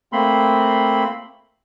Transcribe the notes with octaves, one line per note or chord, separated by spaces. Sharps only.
A3 A#3 C4 B5 C6